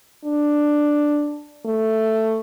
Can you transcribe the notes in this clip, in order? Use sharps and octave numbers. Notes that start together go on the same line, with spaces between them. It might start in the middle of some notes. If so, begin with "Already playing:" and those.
D4
A3